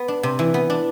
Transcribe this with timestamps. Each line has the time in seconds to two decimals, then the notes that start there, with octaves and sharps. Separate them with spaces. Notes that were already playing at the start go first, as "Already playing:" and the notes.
Already playing: B3
0.08 D4
0.23 C3
0.39 E3
0.54 B3
0.70 D4